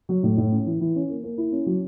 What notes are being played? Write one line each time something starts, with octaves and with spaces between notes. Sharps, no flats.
F#3
A2
A2
C#4
E3
E3
C#4
A#3
A#3
E4
C#4
F#3